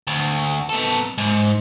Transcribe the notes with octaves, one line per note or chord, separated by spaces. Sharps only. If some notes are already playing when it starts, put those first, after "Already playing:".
D2
B3 A4
G#2